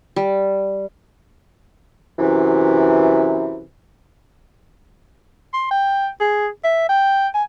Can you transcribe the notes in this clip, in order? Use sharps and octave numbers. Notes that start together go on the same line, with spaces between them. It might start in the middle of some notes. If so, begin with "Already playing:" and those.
G3
F#2 C3 E3
C6
G5
G#4
E5
G5
G#5